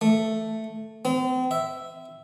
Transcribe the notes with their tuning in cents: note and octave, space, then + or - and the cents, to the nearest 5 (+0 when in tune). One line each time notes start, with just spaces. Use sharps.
A3 +0
C4 -40
E5 +0